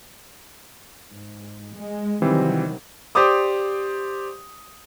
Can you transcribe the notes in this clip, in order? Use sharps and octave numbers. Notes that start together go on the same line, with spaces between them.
G#2
G#3
C3 D#3 E3 F#3 G3 C4
G4 C5 D5 D6 D#6